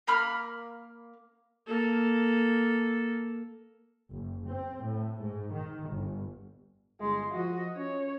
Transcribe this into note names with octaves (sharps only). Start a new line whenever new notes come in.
A#3 B5 F6
A#3 A4
F#1
C4
A2
G#2
D#3
G1
G1 G#3 C6
F3 F#4 D#5
C#4 C#5